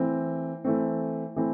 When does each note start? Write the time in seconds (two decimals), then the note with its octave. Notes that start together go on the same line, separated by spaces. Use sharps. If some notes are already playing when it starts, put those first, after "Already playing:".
Already playing: E3 A3 C4
0.64 E3 A3 C4
1.36 E3 A3 C4